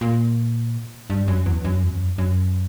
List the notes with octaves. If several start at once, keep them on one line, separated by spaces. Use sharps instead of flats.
A#2
G2
F#2
E2
F#2
E2
F#2
F#2